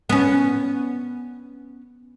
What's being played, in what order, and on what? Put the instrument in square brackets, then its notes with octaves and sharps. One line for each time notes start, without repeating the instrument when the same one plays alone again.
[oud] B3 C#4